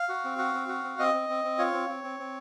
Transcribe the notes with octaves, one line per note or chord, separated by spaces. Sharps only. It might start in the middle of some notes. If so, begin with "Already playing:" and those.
Already playing: F5
F#4
C4
F#4
C4
F#4
C4
C4 D#5
C4
C4
C4
F4 C#5
C4
C4
C4
C4